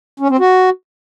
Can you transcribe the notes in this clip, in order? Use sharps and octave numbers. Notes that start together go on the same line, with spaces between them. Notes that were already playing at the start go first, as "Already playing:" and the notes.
C#4
C4
F#4